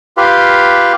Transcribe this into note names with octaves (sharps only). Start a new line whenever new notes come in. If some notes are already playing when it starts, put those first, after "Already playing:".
F4 G4 B4 F5